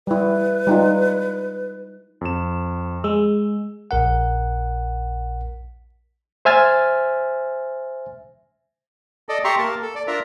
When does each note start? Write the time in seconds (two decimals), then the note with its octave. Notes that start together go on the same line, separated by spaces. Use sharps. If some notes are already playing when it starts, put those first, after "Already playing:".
0.07 G3 E4 B4
0.67 G3 D#4 F4
2.21 F2 E7
3.04 G#3 E6
3.91 A#1 A#4 F#5
6.45 C5 E5 G#5 F6 A6
9.29 A4 D5 D#5
9.44 G4 E5 A#5 C6 C#6
9.58 A#3 A#4 A5
9.82 A4
9.95 D5
10.07 D4 F4 A#4 E5 A#5